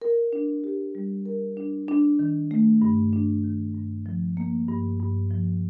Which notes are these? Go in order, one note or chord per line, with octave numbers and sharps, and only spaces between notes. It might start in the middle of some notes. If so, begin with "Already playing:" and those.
A#4
D4
G4
G3
A#4
D4
D4
D#3
A3
G2
D4
D#3
G2
F3
A#3
G2
G2
F3